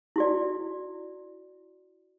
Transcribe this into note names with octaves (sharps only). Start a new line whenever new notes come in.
E4 F#4 D5